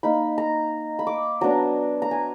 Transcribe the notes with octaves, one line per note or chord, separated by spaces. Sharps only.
A#3 D#4 B5
A#5
B5
D6
F#3 B3 D4 A#5
A#5
G#5